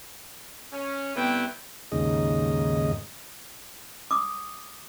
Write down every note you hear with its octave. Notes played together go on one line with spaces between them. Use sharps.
C#4
C3 G3 A3 B3 E4 G5
D#2 G#2 C#3 D#5
D6 D#6